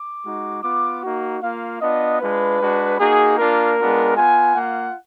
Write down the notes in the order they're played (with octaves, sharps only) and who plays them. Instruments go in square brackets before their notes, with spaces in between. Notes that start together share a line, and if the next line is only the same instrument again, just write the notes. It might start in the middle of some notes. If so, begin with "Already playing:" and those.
Already playing: [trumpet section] D6
G#3 D#4 F#4
B3 F4 D6
A#3 D#4 F#4
A#3 F4 F5
B3 D4 F4 D#5
G#3 D4 F4 B4
G#3 D4 F#4
A#3 D#4 F#4 G#4
A#3 D4 F4 A#4
G#3 B3 D4 F4
B3 F4 G#5
A#3 F4 F#5